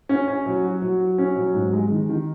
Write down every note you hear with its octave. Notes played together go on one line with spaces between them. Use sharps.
C#4
C#4
F#3
F#4
F#3
F#4
C#4
F#3
G#2
G#3
D#3
D#3